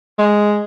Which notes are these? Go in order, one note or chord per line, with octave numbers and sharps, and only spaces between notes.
G#3